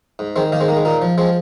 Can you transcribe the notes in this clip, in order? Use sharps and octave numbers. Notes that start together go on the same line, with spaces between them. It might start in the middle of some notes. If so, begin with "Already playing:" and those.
G#2
D#3 G#3 C4
D#3 A#3 D#4
G#3 C4
G#2 A#3
G#3
A#2 A#3 D#4
F3
F3 G#3 C4